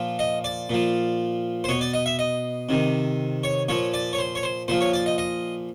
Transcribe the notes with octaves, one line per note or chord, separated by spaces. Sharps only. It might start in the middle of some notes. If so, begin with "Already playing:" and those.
Already playing: A#2 F3
D#5
D5
A#2 F3
C5
B2 C#5
D5
D#5
E5
D#5
C3 D#3
C#5
A#2 F3 C#5
D5
C#5
C5
C#5
C5
A#2 F3 C5
C#5
D5
D#5
D#5